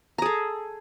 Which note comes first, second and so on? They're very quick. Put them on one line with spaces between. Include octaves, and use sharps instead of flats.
A#5 G#4 A4